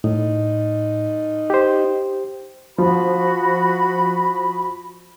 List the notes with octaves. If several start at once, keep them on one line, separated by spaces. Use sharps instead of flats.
A2 D#4
G4 C5
F3 F#4 B5